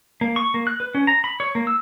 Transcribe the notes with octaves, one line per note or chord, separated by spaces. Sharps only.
A#3
C#6
A#3
F#6
B4
C#4
A#5
B5
C#5
A#3
E6